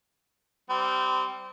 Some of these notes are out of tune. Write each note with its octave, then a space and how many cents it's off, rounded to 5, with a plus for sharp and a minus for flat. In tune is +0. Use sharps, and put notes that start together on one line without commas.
G3 -15 C4 -25